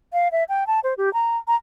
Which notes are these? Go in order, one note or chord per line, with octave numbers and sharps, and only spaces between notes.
F5
E5
G5
A5
C5
G4
A#5
A#5